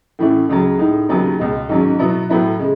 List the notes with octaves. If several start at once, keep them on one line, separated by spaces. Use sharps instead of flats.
A2 E3 A3 C#4 E4
C#2 C#3 F#3
A2 G#3 D#4
D#2 C#3 F#3 B3
C#2 B2 G#3
G#2 D#3 F#3 C#4
B2 F#3 B3 E4
A2 F#3 B3 E4
C#3 G#3